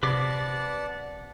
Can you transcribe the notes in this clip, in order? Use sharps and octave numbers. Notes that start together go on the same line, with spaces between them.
C3 B4 D5 F#5 A5 D6